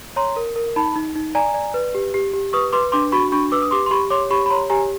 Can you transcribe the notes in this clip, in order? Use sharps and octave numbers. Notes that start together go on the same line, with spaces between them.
C#5 A#5 C6
A#4
A#4
D#4 A5 B5
D#4
D#4
D5 G#5 A#5
D5
B4
G4
G4
G4
B4 C#6 D#6
B4 C6 D6
D4 C6 D6
F#4 B5 C#6
D4 B5 C#6
B4 D6 E6
D#6
G4 C6 D6
C6
G4 B5 C#6
C#5 C6 D6
G4 B5 C#6
B5
C#5 A#5 C6
G4 G#5 A#5